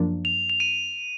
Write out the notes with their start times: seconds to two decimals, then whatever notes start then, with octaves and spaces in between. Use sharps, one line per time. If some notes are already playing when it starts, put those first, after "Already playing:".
Already playing: F#2 F3 A#3 D4
0.25 F7
0.50 F7
0.60 D#7